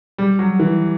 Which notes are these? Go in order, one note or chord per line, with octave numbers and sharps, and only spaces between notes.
G3
F#3
E3